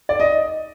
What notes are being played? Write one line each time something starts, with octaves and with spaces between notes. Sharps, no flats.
D5
D#5